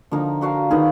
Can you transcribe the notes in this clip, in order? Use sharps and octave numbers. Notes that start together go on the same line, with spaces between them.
D3 F3 A#3 D#4
D4 F#4 A#4 F5
D#3 B3 F4 G#4